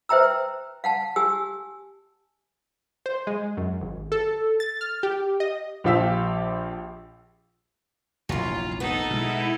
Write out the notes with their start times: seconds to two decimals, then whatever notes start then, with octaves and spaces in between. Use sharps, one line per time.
0.09 B4 C5 E5 G5 A#5 E6
0.84 F5 F#5 A5
1.16 G4 G#5 E6
3.06 C5
3.27 G#3
3.57 F#2
3.81 G#1
4.12 A4
4.60 A6
4.81 F6
5.03 G4
5.40 D#5
5.84 A#1 F3 G4 F5 E6 B6
8.29 F1 A#1 E3 F#3 F4
8.80 B3 D#4 A4
9.10 B2 G#3 E4